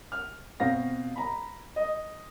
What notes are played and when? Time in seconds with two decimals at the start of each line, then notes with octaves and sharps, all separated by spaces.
0.12 F6
0.60 B2 C4 F5 A#6
1.16 A#5 B5
1.76 D#5